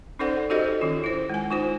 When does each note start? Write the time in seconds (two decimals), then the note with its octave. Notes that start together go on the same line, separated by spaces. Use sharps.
0.19 C#4 D#4 A4 C5 D5 F#5
0.50 D#4 F#4 G4 A4 C5 D#5
0.81 D#3 C#4 F4
1.04 E4 C5
1.30 G#3 G#5
1.51 D#4 F4 C5